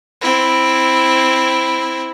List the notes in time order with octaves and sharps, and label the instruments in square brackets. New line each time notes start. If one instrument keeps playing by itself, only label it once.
[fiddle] C4 E4